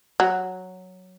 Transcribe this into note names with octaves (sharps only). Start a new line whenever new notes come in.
F#3